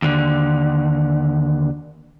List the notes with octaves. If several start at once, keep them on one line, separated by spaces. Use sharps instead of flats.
D#2 D3